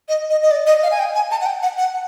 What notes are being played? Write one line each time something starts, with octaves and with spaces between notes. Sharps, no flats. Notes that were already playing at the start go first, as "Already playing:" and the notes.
D#5
D#5
D#5
D5
D#5
F5
G#5
G5
G#5
A5
F#5
G5
F#5
F#5